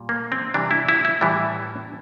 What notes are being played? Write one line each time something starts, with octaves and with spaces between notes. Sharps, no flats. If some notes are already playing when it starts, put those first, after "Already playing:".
Already playing: A#2 G3
A#3
C4
C3 E3 G3 D4
E4
E4
E4
A2 E3 G3